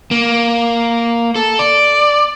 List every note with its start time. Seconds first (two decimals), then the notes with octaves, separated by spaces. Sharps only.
0.11 A#3
1.36 A4
1.59 D5